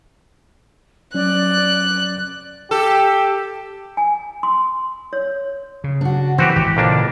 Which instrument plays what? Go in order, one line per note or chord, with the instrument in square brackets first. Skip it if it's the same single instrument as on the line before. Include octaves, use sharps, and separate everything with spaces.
[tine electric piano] F#3 C#4 [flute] D5 [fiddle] F#6
[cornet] G4 [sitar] A4
[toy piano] G#5
C6
C#5
[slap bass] C#3
[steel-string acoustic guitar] D4 F#4
[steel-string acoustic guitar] E3 [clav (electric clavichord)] C4 F#4 G4
[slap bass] G#1 [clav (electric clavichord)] G4
[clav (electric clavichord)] F2 A#3 D4 [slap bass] A#2 C#3